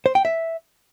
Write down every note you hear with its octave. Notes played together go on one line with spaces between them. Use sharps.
C5
G5
E5